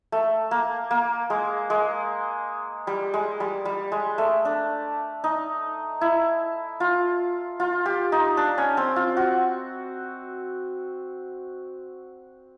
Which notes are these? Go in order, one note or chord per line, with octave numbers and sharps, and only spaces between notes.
A3
A#3
A#3
G#3
G#3
G3
G#3
G3
G3
G#3
A3
D4
D#4
E4
F4
F4
G4
D#4
D4
C#4
C4
F4
F#4